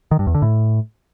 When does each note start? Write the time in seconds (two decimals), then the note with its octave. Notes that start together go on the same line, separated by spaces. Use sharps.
0.11 D#3
0.19 G2
0.27 E2
0.34 D3
0.42 A2